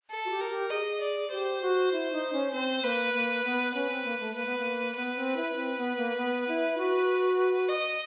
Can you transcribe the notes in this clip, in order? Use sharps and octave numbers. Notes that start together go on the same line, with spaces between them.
A4
F#4
G4
A#4
G4
G#4 D#5
D5
G4 C5
F#4
E4
D#4
C#4
C4 C5
A#3 B4
A#3
B3
C#4 B4
C4
A#3
A3
A#3 B4
B3
A#3
B3 B4
C4
E4
C4
B3
A#3
B3
E4
F#4
B4
D#5